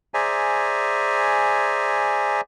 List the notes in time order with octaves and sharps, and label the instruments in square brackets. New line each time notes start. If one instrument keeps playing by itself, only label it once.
[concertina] G#4 C5 D5 E5 G#5 A#5